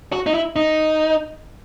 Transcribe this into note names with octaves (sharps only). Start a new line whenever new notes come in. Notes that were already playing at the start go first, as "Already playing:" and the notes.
F#4
D#4
E4
D#4